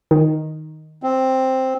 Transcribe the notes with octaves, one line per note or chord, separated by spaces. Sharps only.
D#3
C4